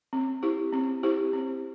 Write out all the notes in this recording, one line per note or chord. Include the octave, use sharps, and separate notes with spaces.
C4
E4 G4 C5
C4
E4 G4 C5
C4